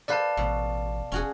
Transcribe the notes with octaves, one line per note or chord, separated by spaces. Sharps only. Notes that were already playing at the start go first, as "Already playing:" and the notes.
A4 B4 C5 D5 F5 A5
A1 B2
E1 C#4 F#4 G#4